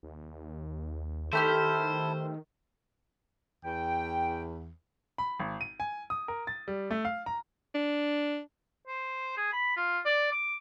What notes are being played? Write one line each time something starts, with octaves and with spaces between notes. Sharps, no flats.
D#2
D#3 A3 E4 G4 A4 C5 F6
E2 G5
B5
G#1
D#7
G#5
D#6
A#4
A6
G3
A3
F5
A#5
D4
C5
G#4
B5
F4
D5
D6